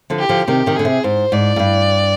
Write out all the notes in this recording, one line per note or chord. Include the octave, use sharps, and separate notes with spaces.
D3 F3
G4
D3 F3
C3 D#3 G4
C3 D#3
D3 G#4
C3
G#2 C5
G#2 D5
G#2
G2